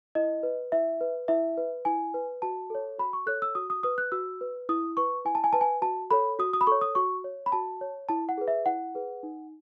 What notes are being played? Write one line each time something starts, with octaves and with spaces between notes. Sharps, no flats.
E4 D#5
B4
E4 E5
B4
E4 E5
B4
E4 G#5
B4
F#4 A5
A4 C#5
F#4 B5
C#6
A4 C#5 F#6
E6
F#4 D#6
D#6
B4 D#6
F#6
F#4 E6
B4
E4 D#6
B4 C#6
E4 G#5
A5
G#5
B4 A5
G#5
F#4 A5
A4 C#5 B5
F#4 D#6
D#6
B5
A4 C#5 C#6
D#6
F#4 C#6
C#5
B5
F#4 A5
C#5
E4 A5
F#5
G#4 B4
E5
E4 F#5
G#4 B4
D#4